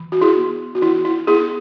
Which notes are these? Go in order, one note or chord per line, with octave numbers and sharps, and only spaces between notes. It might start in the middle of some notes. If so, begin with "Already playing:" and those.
Already playing: E3
F#4
E4 G#4
B3
F#4
E3 E4
E4
B3 E4 G#4